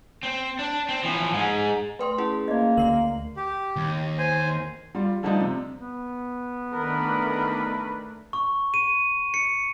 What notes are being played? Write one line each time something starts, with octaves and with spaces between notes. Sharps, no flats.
C4
D4
C4
E3 F3
G#2 G#3
A3 A#4 B4 G5 C6
C#4 E4 G#4
A#3 D5 D#5
D2 A3 A#4 C7 F#7
G4
D#2
C5 G#5
G3 F4
D3 F3 G3 A3 D4 D#4
C3
B3
D#3 A3 D4 A#4 B4 B5
C#6
D#7
C#7